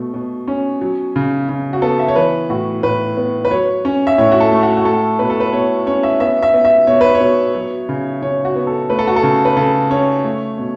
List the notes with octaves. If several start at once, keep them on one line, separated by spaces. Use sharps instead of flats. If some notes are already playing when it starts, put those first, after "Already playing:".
Already playing: B2 A3
B2
C#4
F#3
C#3
C#3
F#4
B3 A4
E5
C#5
E3 B4
A2 F#4
A2 B4
B3
B4
F#3 C#5
C#4
E5
A2 C#5
F#4
A4
A3
F#4
F#4
A3 A4
B2 B4
A4
B4
B2 C#5
C#4 C#5
E5
B3 E5
E5
B3
E5
B2 C#5
B4
C#5
B2
F#3
C#3
C#3 C#5
F#4
B3
A4
A3 B4
A4
F#4
A4
C#3
B4
C#3 A4
C#4 C#5
A3
B2